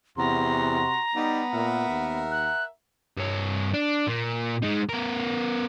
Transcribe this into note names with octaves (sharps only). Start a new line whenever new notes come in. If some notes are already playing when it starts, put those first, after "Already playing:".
E2 C3 F#4 A#5 C6
G3 B3 D#4
A#2 A#4 E5 F#5
D#2
F#6
G2 C#5
D4
A#2 A#3
G#3 D#4
B3 A#4